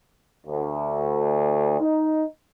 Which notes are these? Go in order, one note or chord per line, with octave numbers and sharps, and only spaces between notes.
D2
D#4